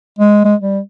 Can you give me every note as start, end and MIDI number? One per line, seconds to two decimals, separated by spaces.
0.18 0.41 56
0.45 0.55 56
0.60 0.80 55